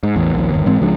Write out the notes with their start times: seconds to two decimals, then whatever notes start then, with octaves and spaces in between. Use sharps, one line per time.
0.03 G#2
0.16 A1 E2
0.34 A#1 D#2
0.52 G1 D#2
0.66 G#2 E3 G#3 C4
0.81 C#2 F3 G#3 D4